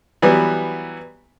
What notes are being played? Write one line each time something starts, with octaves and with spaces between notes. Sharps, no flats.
E3 F#3 G3 B3